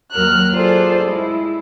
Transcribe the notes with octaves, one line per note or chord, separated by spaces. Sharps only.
D#2 F#3 A#4 F6 F#6
F4 G#4 A4 C5 D5
G#3 E4